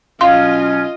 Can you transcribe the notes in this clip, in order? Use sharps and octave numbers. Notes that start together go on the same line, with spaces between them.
B2 F#3 C#4 F4 D#5 F5 C6